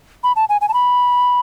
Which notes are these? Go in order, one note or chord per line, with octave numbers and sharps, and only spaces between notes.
B5
A5
G#5
G#5
A5
B5